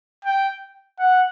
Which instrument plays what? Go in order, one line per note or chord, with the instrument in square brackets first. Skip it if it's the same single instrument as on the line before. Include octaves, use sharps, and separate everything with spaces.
[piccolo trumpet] G5
F#5